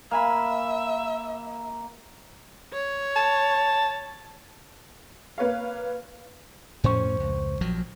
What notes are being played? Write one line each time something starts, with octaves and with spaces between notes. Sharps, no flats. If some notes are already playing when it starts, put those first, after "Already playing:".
A#3 E5 F5 G#5 B5
C#5
A5
A#3 B4 C#5 F5
F2 A2 C#4 C5 C#6
C#2
A#1 F3 F#3